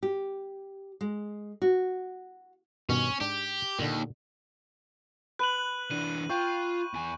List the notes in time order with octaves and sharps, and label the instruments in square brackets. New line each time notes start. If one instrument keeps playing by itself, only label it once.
[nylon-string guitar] G4
G#3
F#4
[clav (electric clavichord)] G2 B2 D#3 [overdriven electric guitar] C#4
[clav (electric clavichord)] G#2 D4 [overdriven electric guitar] G4
[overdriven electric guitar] D#2 [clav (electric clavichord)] A#2 D3
[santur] B4 [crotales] F#6 D#7 F#7
[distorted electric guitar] E3 D4 [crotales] F#6 D#7 F#7
[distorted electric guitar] F4 [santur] G5 [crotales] C#6
[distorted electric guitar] E2 G#5